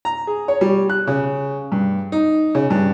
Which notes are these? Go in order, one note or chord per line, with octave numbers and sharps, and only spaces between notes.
A#5
G#4
C#5
G3
F#6
C#3
G2
D#4
C#3
G2